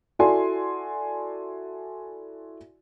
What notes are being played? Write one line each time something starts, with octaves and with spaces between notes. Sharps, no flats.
E4 F#4 A4 D5 G#5 C6